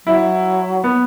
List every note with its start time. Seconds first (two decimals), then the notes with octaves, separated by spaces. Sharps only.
0.06 F#3 E4
0.84 B3